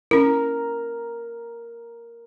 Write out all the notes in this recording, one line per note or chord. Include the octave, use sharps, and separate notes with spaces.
C#4 E4 A#4